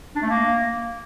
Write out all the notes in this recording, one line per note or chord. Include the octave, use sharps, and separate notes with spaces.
D4
A3
A#3